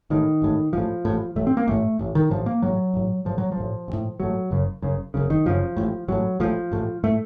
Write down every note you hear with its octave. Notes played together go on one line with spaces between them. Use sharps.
A1 A2 D#3
A1 A2
A1 A2 F3
A1 A2
A1 A2 A3
C4
A#3
A1 A2 A3
A1 A2
D#3
A1 A2 F3
A#3
A1 A2 F#3
A1 A2
A1 A2 F3
F#3
F3
A1 A2
A1
A2
A1 A2 F#3
F#1 F#2 C#3
F#1 F#2 C#3
F#1 F#2 C#3
D#3
F#1 F#2 C#3 F3
A1 A2
A1 A2 F#3
A1 A2 F3
A1 A2
A2 A3